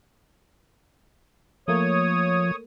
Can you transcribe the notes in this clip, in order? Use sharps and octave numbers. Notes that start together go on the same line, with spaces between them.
F3 A3 A#3 C#5 D#6